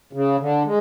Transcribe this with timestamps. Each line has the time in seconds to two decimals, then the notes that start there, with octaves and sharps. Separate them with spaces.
0.13 C#3
0.40 D3
0.65 G#3